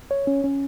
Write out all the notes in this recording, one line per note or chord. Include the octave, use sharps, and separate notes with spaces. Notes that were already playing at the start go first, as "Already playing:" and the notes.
C#5
C#4
C#4